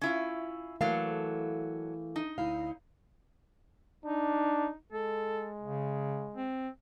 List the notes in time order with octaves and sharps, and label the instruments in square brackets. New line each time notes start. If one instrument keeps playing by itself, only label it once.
[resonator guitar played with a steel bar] C#4 E4 F4
[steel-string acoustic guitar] E3 A3 A#3 [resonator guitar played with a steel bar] F#3 A4 F5
[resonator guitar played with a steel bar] D#4
[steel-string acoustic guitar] D2 E4 F5
[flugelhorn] D4 [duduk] D#4
[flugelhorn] G#3 [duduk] A4
[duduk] C#3
C4